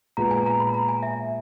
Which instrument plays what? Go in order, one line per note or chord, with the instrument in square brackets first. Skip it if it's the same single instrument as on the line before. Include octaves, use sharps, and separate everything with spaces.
[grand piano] A#2 G#3 B3 [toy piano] A#5
[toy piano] G#5
A#5
B5
A#5
G#5
E5